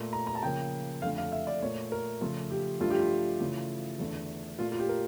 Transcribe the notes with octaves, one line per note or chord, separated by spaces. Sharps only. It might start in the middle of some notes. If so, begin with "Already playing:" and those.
Already playing: A#2 A3
A#5
A#5
A5
C#3 F3 A#3 G5
F2 D3 A3 F5
F5
E5
D5
A#2 A3 C#5
A#4
C#3 F3 A3 F4
G4
G2 F3 A3 F4
G4
F4
C#3 E3 A3
E2 D3 A3
A#2 A3 F4
F4
G4
A#4